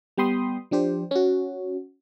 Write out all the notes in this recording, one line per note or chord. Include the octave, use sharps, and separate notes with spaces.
G3 B3 G5 B5 C6 D#6
F3 D4 G4 C5
C#4 F#4